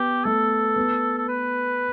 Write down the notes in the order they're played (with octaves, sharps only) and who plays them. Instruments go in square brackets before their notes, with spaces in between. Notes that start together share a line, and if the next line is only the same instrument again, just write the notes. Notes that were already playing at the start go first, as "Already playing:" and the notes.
Already playing: [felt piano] B3 [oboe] G4
[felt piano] A3 [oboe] A4
[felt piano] B3
[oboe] A4
B4